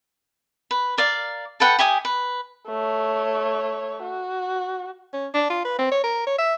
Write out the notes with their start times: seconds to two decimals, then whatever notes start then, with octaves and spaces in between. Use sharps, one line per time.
0.71 B4
0.98 A#4 D5 F5
1.60 A4 B4 F#5 G5
1.79 G4 E5 G#5 D#6
2.05 B4
2.67 A3 C#5
4.03 F#4
5.13 C#4
5.34 D4
5.50 F4
5.65 B4
5.79 C4
5.92 C#5
6.04 A#4
6.27 C#5
6.39 E5